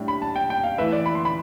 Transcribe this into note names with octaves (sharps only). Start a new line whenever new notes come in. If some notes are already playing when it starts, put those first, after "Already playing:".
Already playing: A2 G3 D4 G4
B5
A5
G5
G5
F5
E3 A3 E4 B4 E5
D5
B5
C6
B5